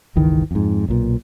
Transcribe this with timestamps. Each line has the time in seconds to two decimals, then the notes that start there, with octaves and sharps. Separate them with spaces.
0.16 G1 C#2 D#3 E3
0.51 F2 G#2
0.88 B1 A#2